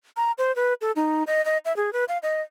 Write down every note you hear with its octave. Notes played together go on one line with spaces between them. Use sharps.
A#5
C5
B4
A4
D#4
D#5
D#5
E5
G#4
B4
F5
D#5